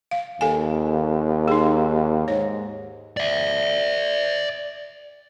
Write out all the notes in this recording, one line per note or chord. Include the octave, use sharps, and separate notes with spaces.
F5
D#2 A4 F5 G#5
D#4 G#4
G#2 C#5
D5 E5